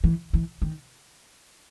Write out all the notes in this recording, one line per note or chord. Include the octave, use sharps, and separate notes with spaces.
E3
E3
D#3